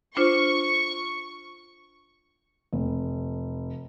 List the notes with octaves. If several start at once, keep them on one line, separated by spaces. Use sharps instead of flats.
D4 F4 C5 C#6
F1